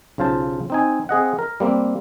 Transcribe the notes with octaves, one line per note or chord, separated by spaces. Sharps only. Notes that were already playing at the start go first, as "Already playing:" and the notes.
B1 C#3 F4 C5 A5
C4 D#4 G#5
C4 G#4 D#5 F#5
A#4
G3 A#3 C4